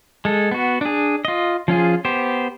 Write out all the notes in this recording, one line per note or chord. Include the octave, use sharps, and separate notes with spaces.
G#3 A4
B3 F#4
D4 G#4
F4 D#5
F3 C#4 F4 G#4
B3 G4 C5